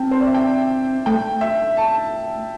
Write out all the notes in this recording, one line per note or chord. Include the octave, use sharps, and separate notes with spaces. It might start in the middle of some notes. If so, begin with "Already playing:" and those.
Already playing: C4 G5 A5
C5
D5
E5
G5
A3 G5
E5
A5